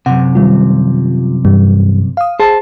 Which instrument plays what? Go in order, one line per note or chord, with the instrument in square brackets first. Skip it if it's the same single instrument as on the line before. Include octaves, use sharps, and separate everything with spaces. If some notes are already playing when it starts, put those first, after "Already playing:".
[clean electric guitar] F#2 C3 [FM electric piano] F#5
[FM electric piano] D#3 G3 F4
G2 E3 G3
F5 D#6
[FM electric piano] G#4 [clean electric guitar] C5 A5